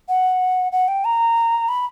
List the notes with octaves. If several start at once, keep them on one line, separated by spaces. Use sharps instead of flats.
F#5
F#5
G5
A#5
B5